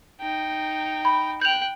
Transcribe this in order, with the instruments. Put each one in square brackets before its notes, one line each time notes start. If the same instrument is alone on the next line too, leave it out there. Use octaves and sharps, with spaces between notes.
[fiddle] D#4 G5
[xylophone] B5
[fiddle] G5 F#6 [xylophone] G6 F7